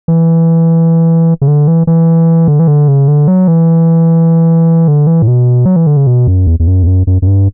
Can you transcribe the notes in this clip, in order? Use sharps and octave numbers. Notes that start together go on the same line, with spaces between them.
E3
C#3
D3
E3
E3
D3
E3
D3
C#3
D3
F#3
E3
D3
E3
A2
B2
F#3
E3
D3
C#3
B2
F#2
E2
E2
F#2
E2
F#2
F#2
F#2
G2